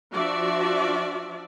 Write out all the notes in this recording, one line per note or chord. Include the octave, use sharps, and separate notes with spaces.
F3 D4 F#4 D5 E5